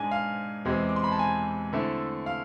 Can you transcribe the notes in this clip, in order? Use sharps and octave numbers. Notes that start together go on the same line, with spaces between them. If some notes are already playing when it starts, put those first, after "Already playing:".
Already playing: G#2 G#3 D4 G#5
F5
E2 C3 G#3 C4
D6
C6
B5
A5
G#5
D3 A3 C4 E4
F5